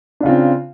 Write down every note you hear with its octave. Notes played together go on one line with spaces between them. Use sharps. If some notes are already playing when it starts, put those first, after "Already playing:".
C#3 C4 D4 F4